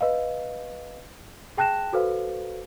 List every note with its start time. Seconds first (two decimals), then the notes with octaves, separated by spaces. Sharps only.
0.01 B4 D#5 F5
1.57 G#4 G5 A5 F#6 A#6 E7
1.93 F#4 A4 B4 C5 F5